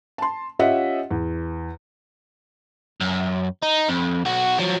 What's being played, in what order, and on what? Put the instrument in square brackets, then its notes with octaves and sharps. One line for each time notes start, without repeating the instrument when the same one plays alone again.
[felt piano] A5 C6
C#4 F4 G4 D#5 E5 F#5
E2
[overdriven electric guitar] F#2
D#4
F2
B1 F#4
F3 F#3